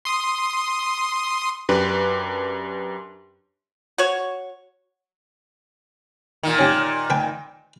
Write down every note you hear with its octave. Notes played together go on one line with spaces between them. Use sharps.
C6 D#6
F#2 D4 G4 B4
F#4 C#5
A#2 D#3
C#4 G4
B4 G5 G#5